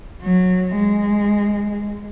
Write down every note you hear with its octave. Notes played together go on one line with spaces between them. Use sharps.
F#3
G#3